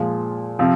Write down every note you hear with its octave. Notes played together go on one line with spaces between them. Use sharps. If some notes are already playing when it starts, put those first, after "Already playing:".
Already playing: A#2 F3 G#3
C3 F3 C4